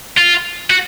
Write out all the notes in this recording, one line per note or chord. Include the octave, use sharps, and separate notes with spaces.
F4
F#4